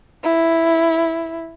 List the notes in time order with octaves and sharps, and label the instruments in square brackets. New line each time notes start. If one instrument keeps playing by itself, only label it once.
[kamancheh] E4